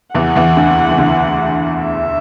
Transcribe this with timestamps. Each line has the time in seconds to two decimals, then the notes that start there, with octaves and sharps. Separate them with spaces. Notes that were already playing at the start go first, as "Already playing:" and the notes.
0.15 E2 E3 F#5
0.36 E2 E3
0.57 D2 D3
0.91 E3
0.98 D2 D3
1.82 E5